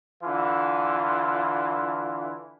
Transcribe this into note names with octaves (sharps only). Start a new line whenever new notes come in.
D3 E3 F4